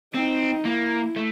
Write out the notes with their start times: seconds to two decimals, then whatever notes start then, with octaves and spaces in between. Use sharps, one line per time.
0.14 C4 D#4
0.65 A#3 E4
1.16 A3